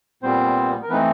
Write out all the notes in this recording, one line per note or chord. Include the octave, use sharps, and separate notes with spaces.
A#2 G3 B3 C4 C5
A#4
E3 A3 B3 C4 D#4 B4